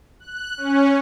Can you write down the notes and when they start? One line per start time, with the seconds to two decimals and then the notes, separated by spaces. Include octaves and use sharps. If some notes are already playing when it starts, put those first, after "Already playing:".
0.20 F#6
0.57 C#4